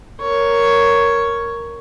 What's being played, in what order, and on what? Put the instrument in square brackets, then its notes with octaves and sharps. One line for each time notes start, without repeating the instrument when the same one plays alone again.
[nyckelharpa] A#4 C#5